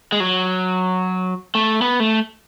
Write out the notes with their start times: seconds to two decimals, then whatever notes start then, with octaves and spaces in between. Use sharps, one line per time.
0.12 G#3
0.20 F#3
1.55 A3
1.82 B3
2.00 A3